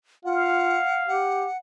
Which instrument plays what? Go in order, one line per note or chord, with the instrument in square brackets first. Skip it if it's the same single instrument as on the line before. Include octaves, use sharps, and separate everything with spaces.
[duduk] F4 [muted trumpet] F5 [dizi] F#5
[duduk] G4 [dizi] F#5